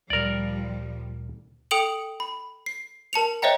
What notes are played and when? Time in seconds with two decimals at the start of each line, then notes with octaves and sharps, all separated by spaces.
0.10 D2 A#2 F3 G3 A#4 D5
1.71 A4 G5 D#6 D7 F7 F#7
2.20 B5
2.66 C7
3.13 A#4 A5 C#7 F7
3.42 C5 C#5 D#5 E5 G5 A#5